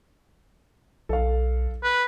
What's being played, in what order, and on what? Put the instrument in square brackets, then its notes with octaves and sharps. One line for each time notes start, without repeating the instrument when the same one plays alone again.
[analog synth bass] B1 [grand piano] A4 F5
[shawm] B4